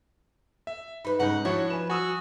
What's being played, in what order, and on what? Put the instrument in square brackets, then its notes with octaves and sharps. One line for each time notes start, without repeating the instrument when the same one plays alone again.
[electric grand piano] E5
[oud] D#4 B4 [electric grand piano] B5
[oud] G#2 C#3 [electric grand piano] D#4 A#5 [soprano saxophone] F#5
[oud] F3 [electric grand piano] D4 E4 F#4 [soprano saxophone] C#5
[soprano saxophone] B4 [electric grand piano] G#5 E7
[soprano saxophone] F#4 [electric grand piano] G#5 D#6 E6